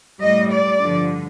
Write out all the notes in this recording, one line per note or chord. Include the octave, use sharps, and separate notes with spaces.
A2 G3 D#5
D5
G2 D3 F3